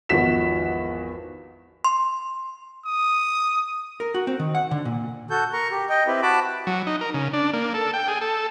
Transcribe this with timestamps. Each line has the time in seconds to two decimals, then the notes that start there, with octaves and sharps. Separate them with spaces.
0.09 G#1 E2 F3 F#4 B6 E7
1.85 C6
2.85 D#6
4.00 A#4
4.15 F#4
4.27 C4
4.39 D#3
4.55 F#5
4.71 D3
4.85 A#2
5.30 F#4 A4 G6
5.53 A#4 A#5 C#6
5.71 G4
5.89 D#5 G5
6.07 C4 E4 G4 B4
6.22 F#4 A5 B5 D6
6.67 F#3
6.87 D#4
7.01 A#4
7.14 C#3
7.33 D4
7.53 A#3
7.74 A4
7.94 G5
8.08 G#4
8.21 A4